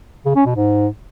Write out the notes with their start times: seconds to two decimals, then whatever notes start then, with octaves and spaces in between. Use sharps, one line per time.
0.25 C#3
0.35 C#4
0.46 B2
0.56 G#2